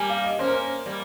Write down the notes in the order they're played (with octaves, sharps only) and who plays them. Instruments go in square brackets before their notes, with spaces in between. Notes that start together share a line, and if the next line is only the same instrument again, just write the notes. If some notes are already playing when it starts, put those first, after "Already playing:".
Already playing: [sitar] G3 A#3 [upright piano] G#5
[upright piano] F5
D#5
[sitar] A#3 C#4 [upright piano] C5
[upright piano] A#4
C5
[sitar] G3 A#3